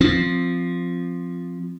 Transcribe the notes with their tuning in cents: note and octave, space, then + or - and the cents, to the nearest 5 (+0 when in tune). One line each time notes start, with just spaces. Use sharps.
F3 +0 C4 +0